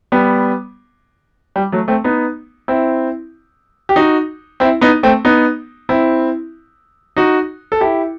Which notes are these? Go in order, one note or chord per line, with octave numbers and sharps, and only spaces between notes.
G3 B3
G3
F#3 A3
A3 C4
B3 D#4
C4 E4
G4
D#4 F#4
C4 E4
B3 D#4
A3 C4
B3 D#4
C4 E4
D#4 F#4
A4
E4 G4